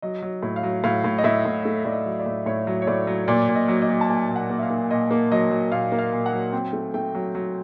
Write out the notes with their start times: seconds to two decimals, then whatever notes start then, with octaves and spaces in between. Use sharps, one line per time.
0.02 F#3 D#5
0.22 F#3
0.43 A2
0.56 F5
0.63 F#3
0.84 A2 F5
1.04 A2
1.18 D#5
1.24 A2 E5
1.45 A2
1.65 A3
1.85 A2 D5
1.92 D#5
2.05 F#3
2.19 D5
2.26 A2
2.46 A2 C#5
2.67 F#3
2.82 C#5
2.87 A2 D5
3.07 F#3
3.28 A#2 D5
3.49 A#2
3.55 D#5
3.68 F#3
3.82 D#5
3.89 F#3
4.01 A5
4.09 A#3 G#5
4.29 A#2
4.36 F#5
4.50 A#3
4.59 E5
4.63 F5
4.70 A#3
4.91 A#2 D#5
5.11 A#3
5.32 F#3 D#5
5.51 F#3
5.72 A#2 F5
5.92 A#3
5.99 F5
6.12 A#2
6.26 F#5
6.33 F#3
6.53 C4 G5
6.73 A3
6.94 A3 G5
7.15 F#3
7.35 F#3